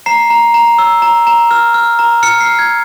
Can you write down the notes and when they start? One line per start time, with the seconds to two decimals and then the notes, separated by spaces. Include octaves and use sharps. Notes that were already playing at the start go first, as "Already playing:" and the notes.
0.06 A#5 C7
0.30 A#5
0.54 A#5
0.78 E6
1.02 A#5
1.27 A#5
1.51 F6
1.74 F6
1.99 A#5
2.23 F6 C#7
2.41 C7
2.46 F6
2.59 G#6